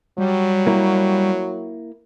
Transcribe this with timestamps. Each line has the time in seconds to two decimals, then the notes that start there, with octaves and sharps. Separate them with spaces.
0.18 F#3 G3
0.67 A#3 E4